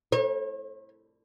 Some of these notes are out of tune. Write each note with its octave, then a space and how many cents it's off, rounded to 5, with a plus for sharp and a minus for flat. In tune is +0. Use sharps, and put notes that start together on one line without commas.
C#5 -40